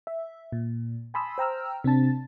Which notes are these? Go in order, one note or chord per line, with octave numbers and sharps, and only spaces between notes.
E5
A#2
G#5 A5 B5 C6 D#6 E6
C5 G5 A#5 E6 F6
C3 C4 D4 A5 A6